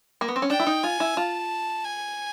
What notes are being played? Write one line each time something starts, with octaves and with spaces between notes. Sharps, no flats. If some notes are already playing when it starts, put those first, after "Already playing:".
A#3
B3
C4
C#4
D4 G5
E4
D#4
F4 G#5
E4
F4 A5
G#5